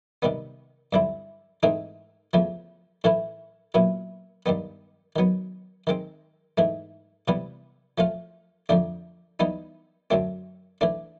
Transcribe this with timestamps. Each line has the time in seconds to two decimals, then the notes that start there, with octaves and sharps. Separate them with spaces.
0.22 C3 D#3 G3 B3
0.93 G2 D3 G3 C4 E4
1.63 G#2 E3 A3 C4 D#4
2.33 E2 C#3 F3 A3
3.04 A2 E3 A3 C#4 E4
3.74 A#2 F#3 B3 E4
4.46 G2 D#3 G3 B3
5.16 D#3 F#3 B3
5.87 D#3 G#3 C4
6.58 G#2 E3 A3
7.28 C3 E3 G3 B3
7.98 F3 A3 C#4 F4
8.69 F2 D3 F3 A3 D4
9.40 E3 G3 B3 D#4
10.10 F#2 D3 F#3 A3 C4
10.81 E3 A3 D4